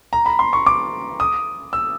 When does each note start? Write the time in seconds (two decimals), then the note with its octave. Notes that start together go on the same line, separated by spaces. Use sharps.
0.13 A#5
0.26 B5
0.39 C6
0.53 C#6
0.66 D6
1.20 D#6
1.73 E6